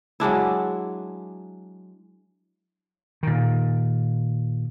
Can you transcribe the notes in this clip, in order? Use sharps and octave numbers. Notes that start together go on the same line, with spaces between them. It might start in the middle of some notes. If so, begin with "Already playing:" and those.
F#3 G#3 D4 E4
A#2 D#3